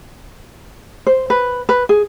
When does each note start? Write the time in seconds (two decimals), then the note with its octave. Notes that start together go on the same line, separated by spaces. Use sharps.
1.07 C5
1.30 B4
1.69 B4
1.89 G#4